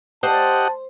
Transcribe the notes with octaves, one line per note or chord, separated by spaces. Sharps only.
G4 C5 D#5 F#5 A5